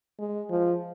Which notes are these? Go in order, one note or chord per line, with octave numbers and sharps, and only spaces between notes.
G#3
F3